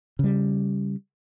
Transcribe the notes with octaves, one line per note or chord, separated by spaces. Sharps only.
C#3 G3